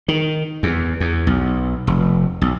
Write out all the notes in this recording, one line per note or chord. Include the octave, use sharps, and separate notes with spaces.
D#3
E2
E2
B1
F1
B1